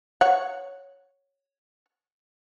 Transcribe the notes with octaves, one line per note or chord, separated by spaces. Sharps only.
C#5 F#5